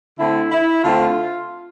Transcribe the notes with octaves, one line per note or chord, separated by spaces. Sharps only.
D3 A3 C4 E4
E4
D3 A3 C4 F4